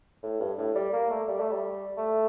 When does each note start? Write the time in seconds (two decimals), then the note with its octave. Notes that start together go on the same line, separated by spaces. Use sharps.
0.23 A2
0.40 G2
0.58 A2
0.75 G3
0.93 A#3
1.10 A3
1.28 G3
1.40 A3
1.52 G3
1.97 A3